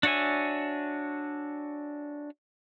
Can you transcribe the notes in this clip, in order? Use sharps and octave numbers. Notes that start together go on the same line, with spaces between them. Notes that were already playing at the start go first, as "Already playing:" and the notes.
D4 F#4 C#5 E5 G#5